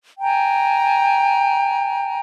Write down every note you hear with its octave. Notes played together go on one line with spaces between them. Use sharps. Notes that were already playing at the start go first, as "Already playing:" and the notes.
G5 G#5 A#5